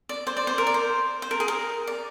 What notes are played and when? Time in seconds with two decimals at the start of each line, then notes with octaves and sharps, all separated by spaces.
0.09 D5
0.27 C5
0.37 D5
0.47 C5
0.58 A#4
0.67 D5
0.74 C5
1.22 C5
1.31 A#4
1.40 G#4
1.48 A#4
1.87 D5